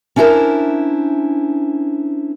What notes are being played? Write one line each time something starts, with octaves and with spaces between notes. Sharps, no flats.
C#4 D4 E4 A4 A#4 C5